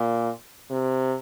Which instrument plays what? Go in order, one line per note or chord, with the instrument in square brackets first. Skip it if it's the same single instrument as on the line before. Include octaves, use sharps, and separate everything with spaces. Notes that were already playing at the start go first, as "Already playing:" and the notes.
Already playing: [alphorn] A#2
C3